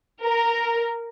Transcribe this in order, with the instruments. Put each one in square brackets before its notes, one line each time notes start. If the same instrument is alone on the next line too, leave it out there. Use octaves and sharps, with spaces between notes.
[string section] A#4